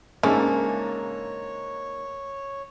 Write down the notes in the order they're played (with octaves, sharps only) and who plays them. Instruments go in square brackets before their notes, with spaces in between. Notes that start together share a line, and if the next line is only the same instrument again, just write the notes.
[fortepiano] G#2 D4 E5 [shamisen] C#3 [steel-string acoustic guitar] A#3 D#4 [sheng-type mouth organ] C#5